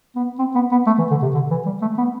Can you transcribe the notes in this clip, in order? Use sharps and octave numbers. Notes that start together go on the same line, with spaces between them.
B3
C4
B3
B3
A3
E3
D3
C3
D3
E3
G3
A3
B3